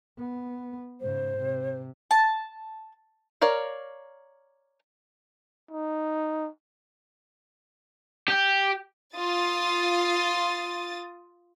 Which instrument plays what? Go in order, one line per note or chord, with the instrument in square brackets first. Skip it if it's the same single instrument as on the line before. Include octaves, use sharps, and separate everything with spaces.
[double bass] B3
[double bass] G#2 C#3 [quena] C5
[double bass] C3
[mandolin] A5
[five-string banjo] A#4 C#5 D5 F5
[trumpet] D#4
[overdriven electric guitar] G4
[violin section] F4 D#6 A6